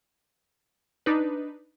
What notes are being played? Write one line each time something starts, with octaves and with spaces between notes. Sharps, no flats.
D4 D#4 B4